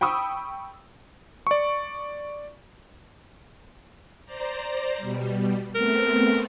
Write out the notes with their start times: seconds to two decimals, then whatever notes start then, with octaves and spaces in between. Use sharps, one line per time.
0.01 G5 B5 C#6 D#6 E6
1.47 D5 C#6
4.25 C5 D5 A#5
4.97 B2 G3
5.75 A3 B3 C4 A#4